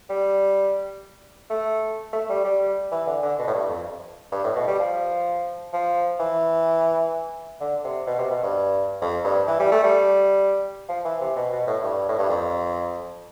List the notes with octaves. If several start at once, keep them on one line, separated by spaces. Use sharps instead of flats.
G3
A3
A3
G3
G3
E3
D3
D3
B2
A2
G2
F2
G2
A2
B2
G3
F3
F3
E3
D3
C3
B2
C3
B2
G2
F2
G2
E3
G3
A3
G3
F3
E3
C3
B2
B2
A2
G2
A2
G2
F2